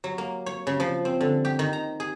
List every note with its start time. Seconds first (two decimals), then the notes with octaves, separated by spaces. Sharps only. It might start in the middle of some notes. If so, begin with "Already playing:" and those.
0.04 F#3
0.18 A#3
0.46 C#5
0.67 C#3
0.80 F3
1.05 C4
1.21 D3
1.45 G4
1.59 D#3
1.73 A#5
2.00 G#4